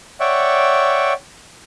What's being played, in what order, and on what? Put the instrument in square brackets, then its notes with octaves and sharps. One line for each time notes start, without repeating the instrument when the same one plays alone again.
[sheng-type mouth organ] C#5 D5 E5 F#5 G5 C#6